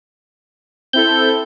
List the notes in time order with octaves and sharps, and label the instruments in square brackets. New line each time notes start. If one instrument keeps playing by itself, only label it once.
[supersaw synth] C4 E4 A4 [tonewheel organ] G6